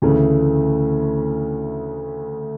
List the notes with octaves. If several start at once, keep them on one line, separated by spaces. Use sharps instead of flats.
D2 C#3 E3 A3